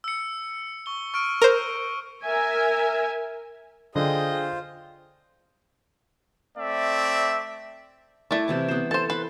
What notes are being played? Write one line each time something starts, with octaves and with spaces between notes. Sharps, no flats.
E6 C#7
C#6 G7
C#6 F6 D7
A#4 C5
A#4 E5 G#5
D3 F4 G#4 C5 D#5 G5
A3 C4 D5 E5
A3 E4 D5
C3 E3 A5
B3 C5
A4 C5 A5
B4 C6